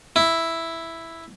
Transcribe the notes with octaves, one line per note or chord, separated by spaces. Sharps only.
E4